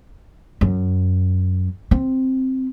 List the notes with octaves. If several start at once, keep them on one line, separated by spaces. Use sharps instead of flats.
F#2
C4